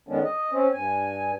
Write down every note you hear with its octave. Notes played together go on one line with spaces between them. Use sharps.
F2 D#3 G#3 B3 C#4 D4
D#5
C4 C#4
G2 G#5